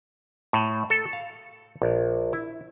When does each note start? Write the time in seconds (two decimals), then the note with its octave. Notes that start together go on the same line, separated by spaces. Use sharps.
0.53 A2
0.90 A4
1.13 F5
1.82 A#1
2.33 E4